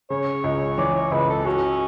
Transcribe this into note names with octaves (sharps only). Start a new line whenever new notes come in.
C#3 C#5
C#2
E3 D5
C#5
C#2 B4
A4
C#4 F#4